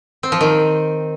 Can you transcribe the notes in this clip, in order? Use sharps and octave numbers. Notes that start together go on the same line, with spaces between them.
C4
F3
D#3